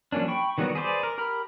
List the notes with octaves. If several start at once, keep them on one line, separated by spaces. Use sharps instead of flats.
F3 F#3 A#3 C#4 D4
G5 B5 C#6
D#3 F#3 G3 B3 F#4
G#4 B4 C5 D5
A#4
G4 A#4 A#5 B5 F6